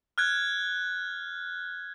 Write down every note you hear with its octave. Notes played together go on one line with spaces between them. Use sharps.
F6 F#6 G#6